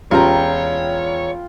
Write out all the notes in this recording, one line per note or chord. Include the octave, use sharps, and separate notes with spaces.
E1 C#4 F4 G4 G#4 C#5 G5 A#5